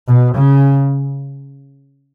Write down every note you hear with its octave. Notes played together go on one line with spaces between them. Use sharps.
B2
C#3